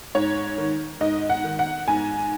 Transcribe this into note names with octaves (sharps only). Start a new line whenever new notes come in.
G#2 C#5
D#3
G#2 D#5
F#5
D#3
F#5
G#2 G#5